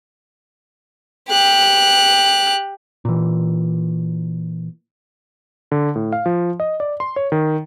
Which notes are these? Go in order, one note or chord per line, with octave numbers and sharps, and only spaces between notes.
G4 F#6
A#2 E3
D3
A2
F5
F3
D#5
D5
C6
C#5
D#3